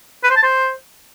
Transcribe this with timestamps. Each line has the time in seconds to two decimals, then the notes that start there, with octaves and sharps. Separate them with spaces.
0.24 B4
0.30 C5
0.37 A5
0.43 C5